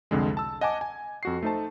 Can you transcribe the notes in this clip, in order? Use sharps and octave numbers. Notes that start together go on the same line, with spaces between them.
C2 F2 D3 G#3
A5 E6
D#5 F#5 G#5 A5 D6
G#5
F2 F#4 C7
A3 D#4 C5 A5